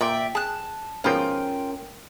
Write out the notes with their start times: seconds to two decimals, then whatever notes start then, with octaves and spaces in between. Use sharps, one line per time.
0.01 A#2 D5 E5 G5
0.35 G#4 A5 F#6
1.04 G#2 B2 F3 C#4 F4 A#4 G5